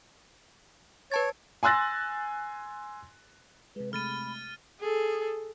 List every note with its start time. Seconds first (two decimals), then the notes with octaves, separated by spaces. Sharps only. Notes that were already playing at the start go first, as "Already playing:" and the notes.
1.12 B4 C#5 A5 A6
1.63 G#5 C6 E6 F#6 A6 A#6
3.76 C3 G#3 B4
3.93 C3 G#3 A3 B5 F6 A6 D#7
4.80 G#4 A4